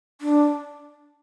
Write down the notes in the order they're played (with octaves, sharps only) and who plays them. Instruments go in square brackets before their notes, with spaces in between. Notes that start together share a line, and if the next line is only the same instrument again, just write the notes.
[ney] D4